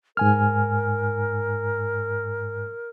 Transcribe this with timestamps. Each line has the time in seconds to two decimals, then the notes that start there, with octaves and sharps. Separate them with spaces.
0.17 G#2 A#4 G#5 F6